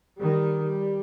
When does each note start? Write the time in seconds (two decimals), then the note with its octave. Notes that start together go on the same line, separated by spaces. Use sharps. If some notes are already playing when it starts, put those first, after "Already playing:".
0.18 D#3 G3
0.64 G3